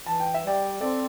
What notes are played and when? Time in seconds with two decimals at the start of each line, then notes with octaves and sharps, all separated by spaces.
0.06 E3 A5
0.20 G5
0.34 E5
0.44 G3 D5 G5
0.81 C4 A4 D5